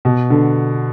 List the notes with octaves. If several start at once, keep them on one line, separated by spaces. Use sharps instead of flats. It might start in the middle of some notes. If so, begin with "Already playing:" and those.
B2
D3